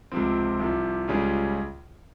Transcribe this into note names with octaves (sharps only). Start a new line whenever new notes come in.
C#2 C3 F3 C4
C2 C3 F3
C#2 C#3 G3 C#4 F4